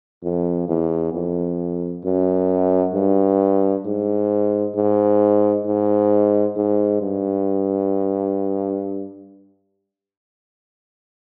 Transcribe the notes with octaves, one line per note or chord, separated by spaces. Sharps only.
F2
E2
F2
F#2
G2
G#2
G#2
G#2
G#2
G2